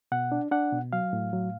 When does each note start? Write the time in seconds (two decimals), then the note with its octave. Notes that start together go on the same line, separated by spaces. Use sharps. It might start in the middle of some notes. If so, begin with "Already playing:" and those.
0.12 B2 F#5
0.32 D4
0.51 D4 F#5
0.72 B2
0.93 F#3 F5
1.13 A2
1.33 F#3